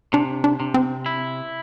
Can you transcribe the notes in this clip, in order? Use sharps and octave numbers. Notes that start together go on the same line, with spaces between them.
C3 D4
D4
C3
C4
E4